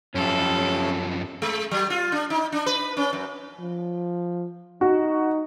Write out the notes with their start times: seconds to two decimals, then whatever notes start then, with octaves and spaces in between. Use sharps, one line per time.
0.15 F#2 F3 C#4 G4 A4
1.42 G#3
1.71 F#3
1.90 F4
2.12 D4
2.30 D#4
2.52 D4
2.66 B4
2.97 C#4
3.13 F#2
3.59 F3
4.81 D#4 F#4